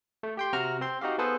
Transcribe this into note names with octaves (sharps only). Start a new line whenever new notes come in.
A3
G4 G5 C6
C3 F#4 A#5 C#6 F6
C4 C5 C6
D#4 F#4 G4 F5
B3 G#4 A4 B4 C5